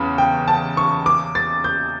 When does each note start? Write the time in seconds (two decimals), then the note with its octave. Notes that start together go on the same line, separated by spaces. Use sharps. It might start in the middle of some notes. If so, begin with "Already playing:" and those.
Already playing: E2 C#3 B5
0.18 G5
0.48 A5
0.77 C#6
1.06 D6
1.35 A6
1.64 G6